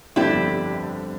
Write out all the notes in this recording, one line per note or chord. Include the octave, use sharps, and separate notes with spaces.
G1 F2 D3 G3 D4 E4 G4